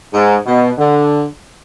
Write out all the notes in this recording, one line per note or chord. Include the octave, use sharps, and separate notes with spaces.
G#2
B2
D3